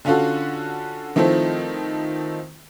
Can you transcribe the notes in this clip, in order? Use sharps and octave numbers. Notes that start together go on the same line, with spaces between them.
D3 C#4 F4 F#4 A4
D#3 F3 A3 C4 E4